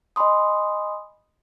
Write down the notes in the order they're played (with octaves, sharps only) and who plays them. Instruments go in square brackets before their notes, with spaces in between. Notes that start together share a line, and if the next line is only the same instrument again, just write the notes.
[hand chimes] D#5 G#5 B5 C6 D#6